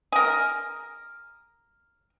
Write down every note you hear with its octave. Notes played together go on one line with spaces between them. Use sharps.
G#4 A#4